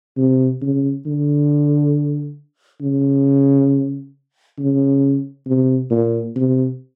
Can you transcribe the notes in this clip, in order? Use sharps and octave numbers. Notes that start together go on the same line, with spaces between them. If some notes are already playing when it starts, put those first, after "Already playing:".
C3
C#3
D3
C#3
C#3
C3
A#2
C3